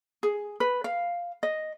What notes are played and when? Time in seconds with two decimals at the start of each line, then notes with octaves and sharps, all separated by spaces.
0.23 G#4
0.60 B4
0.84 F5
1.43 D#5